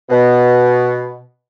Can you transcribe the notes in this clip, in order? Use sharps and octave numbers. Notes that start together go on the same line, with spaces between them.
B2